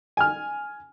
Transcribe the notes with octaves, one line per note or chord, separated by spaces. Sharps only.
G#5 F6